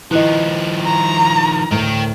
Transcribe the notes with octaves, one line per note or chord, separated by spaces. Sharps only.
D#3 F3 E4 B4 D#5 F#6
A#5
D2 A2 A#4 G5